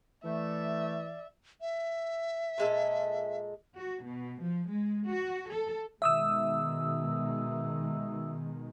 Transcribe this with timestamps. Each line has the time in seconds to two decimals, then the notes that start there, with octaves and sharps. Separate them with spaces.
0.24 E3 A3 D5 E5
1.61 E5
2.58 A#2 G#3 A4
3.74 F#4
4.03 B2
4.41 F3
4.70 G#3
5.08 F#4
5.50 A4
6.02 B2 D#3 G#3 E5 D#6 E6